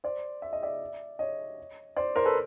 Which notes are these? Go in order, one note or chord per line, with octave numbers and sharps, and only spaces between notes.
C5 D5
E5
D#5
D5 E5
C#5 D#5
C5 D5
A#4 C5
A4 B4